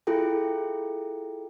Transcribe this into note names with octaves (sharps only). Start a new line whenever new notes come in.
E4 F4 G#4 A4 G5